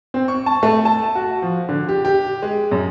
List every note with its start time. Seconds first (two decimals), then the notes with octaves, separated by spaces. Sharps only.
0.14 C4
0.28 C#6
0.46 A5
0.63 A3
0.85 A5
1.15 F#4
1.42 F3
1.69 D3
1.89 G4
2.05 G4
2.42 G#3
2.71 F#2